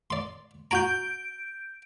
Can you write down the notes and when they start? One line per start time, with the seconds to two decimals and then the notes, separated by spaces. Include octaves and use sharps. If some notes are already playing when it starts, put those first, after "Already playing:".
0.10 D5 C6
0.71 F#4 G#5 A#5 G6 D7